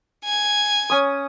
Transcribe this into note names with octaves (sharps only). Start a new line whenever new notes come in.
G#5
C#4 D#6